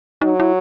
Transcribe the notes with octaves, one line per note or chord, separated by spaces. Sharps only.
F#3 D#4
E4